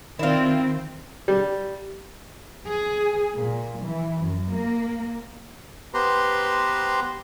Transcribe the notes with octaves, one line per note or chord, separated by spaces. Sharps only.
D#3 C4 E4 F4
G3
G#4
A#2
E3
F#2
A#3
B3 G4 B4 C5 A#5 C6